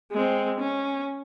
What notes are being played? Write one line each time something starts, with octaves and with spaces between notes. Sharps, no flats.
G#3 C4
C#4